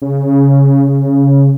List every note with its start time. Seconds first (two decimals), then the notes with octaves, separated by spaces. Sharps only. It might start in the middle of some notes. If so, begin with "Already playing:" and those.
0.02 C#3